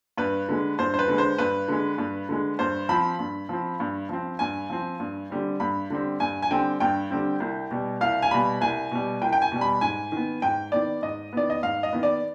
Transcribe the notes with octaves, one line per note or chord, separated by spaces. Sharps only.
G2 B4
D3 G#3
G2 C5
C5
B4
D3 G#3
C5
G2 B4
D3 G#3
G2
D3 G#3
G2 C5
F3 C4 B5
G2
F3 C4
G2
F3 C4
G2 G#5
F3 C4
G2
D3 G3 C4
G2 B5
D3 G3 C4
G2 G#5
G#5
D3 G3 C4 G5
G2 G5
D3 G3 C4
C2
B2 G3
C2 F5
G#5
B2 G3 B5
C2 G#5
B2 G3
C2 G5
G5
G#5
B2 G3
B5
G#2 G#5
D#3 B3
G#2 G5
D#3 B3 D5
G#2 D#5
D#3 B3 D5
D#5
G#2 F5
D#5
D#3 B3
D5